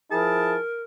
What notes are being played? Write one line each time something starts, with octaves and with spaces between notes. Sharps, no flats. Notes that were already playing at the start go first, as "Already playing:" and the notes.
F3 E4 G#4 A#4 A5